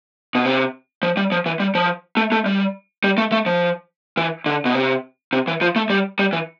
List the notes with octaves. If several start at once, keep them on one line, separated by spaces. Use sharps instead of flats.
B2
C3
F3
G3
F3
E3
G3
F3
A3
A3
G3
G3
A3
A3
F3
E3
D3
B2
C3
C3
E3
F3
A3
G3
G3
E3